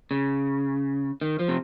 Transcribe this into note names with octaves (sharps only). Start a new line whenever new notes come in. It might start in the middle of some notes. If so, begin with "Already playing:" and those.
C#3
D#3
F3
C3